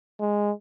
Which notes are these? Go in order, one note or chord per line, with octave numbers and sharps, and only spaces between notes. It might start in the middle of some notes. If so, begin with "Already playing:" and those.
G#3